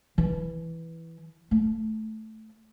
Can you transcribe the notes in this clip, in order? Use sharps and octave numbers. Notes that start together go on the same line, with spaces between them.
E3 E4
A3